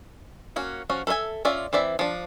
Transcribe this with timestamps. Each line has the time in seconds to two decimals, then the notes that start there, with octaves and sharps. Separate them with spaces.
0.56 A#3 C#4 F#4
0.90 F3 C#4 F#4
1.07 A4 B4 C5 E5 G#5
1.45 C#4 F4 D5 E5
1.73 E3 C4 D5 E5
1.99 F3 D4